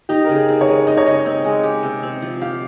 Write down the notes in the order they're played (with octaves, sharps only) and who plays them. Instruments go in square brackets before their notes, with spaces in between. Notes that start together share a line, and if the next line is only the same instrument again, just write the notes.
[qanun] D#4 [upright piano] G4
[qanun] C#3 [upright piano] A#4
[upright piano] G#4
[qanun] C4
[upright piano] C#5
[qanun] G#3
[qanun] D#4 [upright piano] D#5
[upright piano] C#5
[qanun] C#3 [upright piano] D#5
[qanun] C4
G#3
G4
C3
C4
F3
[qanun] G4 [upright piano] F5